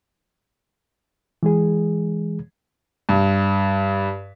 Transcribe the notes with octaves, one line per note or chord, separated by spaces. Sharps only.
E3 G#3 G#4
G2